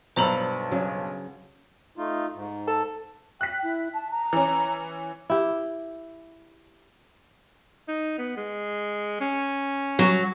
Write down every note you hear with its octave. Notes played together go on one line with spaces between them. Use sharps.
B1 G2 F#3 A4 C5 A#5 B5
C#3 F#3
A3 D#4 F4
G#2
A4
G5 F#6 B6
E4
A5
A#5
E3 C#4
E4 G4
D#4
B3
G#3
C#4
F#3